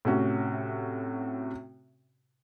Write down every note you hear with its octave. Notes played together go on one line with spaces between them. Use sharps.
A2 C3 C#4 F#4